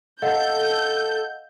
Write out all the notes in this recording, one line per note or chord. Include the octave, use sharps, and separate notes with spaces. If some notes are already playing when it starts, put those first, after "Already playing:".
A4 D#5 F5 F#5 G6